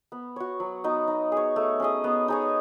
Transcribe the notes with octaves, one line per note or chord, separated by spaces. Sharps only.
B3
F#4 C#5
F#3
B3 D#4 F#4
D#4
G#4 C#5
A3
C#4 G#4 D#5
B3
D#4 G#4 C#5